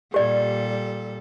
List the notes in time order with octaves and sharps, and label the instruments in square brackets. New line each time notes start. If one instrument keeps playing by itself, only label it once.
[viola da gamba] A#2 G3 A4 [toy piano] G4 D5